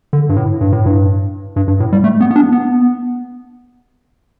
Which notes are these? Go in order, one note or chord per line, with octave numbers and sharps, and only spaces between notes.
D3
G2
A2
G2
A2
G2
G2
G2
A2
G3
A3
B3
B3
D4
B3